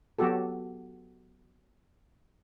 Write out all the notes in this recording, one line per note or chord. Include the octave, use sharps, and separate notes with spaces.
F#3 B3 F#4 G4 A4